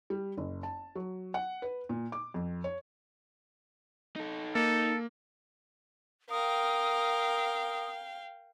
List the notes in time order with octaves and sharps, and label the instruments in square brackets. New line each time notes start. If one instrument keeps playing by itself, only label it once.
[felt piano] G3
F#1
A5
F#3
F#5
B4
A#2
D6
F2
C#5
[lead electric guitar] D#4 A4
[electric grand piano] A#3 [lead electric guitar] D#4 [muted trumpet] A4
[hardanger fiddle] A#4 [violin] F5 G5 [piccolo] D#6